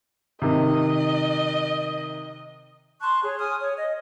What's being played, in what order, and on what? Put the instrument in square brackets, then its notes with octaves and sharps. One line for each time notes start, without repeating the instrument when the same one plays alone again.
[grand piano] C3 D#3 [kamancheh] D#5
[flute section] A5 C6 C#6 F#6
G#4 C#5
G#5 D#6 F6
C#5
D#5